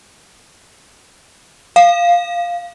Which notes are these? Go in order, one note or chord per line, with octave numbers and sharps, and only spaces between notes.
F5